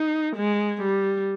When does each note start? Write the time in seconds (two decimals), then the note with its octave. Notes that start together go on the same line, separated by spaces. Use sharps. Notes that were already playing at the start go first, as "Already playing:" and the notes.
Already playing: D#4
0.36 G#3
0.82 G3